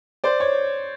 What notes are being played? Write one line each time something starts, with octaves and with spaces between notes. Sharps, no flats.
C5 D5
C#5